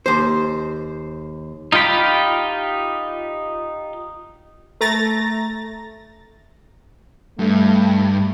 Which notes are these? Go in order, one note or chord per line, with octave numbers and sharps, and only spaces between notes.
D#2 C5
D#4 F4 G4 G5 B5
A3 A#5 A6 A#6
G2 A3